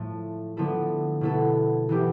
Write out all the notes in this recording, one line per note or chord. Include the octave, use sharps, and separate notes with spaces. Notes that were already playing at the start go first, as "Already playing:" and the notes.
Already playing: A2 F3 A3
D3 F3 B3 E4 A4
B2 B3 E4 A4
E3 B3 E4 G4